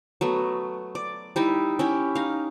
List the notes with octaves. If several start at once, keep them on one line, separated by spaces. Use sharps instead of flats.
F#3 A3 B3
D5
G3 D#4 E4
C#4 E4 G4
D#4 F5